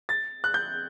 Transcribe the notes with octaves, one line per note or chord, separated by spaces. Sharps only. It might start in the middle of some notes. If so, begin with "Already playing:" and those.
A6
F#6
G6